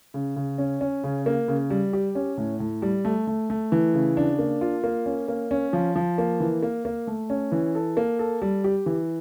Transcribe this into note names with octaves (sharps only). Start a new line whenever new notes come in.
C#3
C#3
C#4
C#4
C#3
A#3
C#3
G3
G4
C#4
A2
A2
G3
A3
A3
A3
E3
C#3
D4
A#3
F4
A#3
C#4
A#3
C#4
F3
F3
A#3
E3
A#3
A#3
A3
C#4
E3
A4
A#3
A4
G3
G4
E3